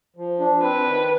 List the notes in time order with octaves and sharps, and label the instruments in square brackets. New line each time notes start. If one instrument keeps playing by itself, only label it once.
[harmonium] F3
D4
[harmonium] C4 [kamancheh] B4
[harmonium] D#3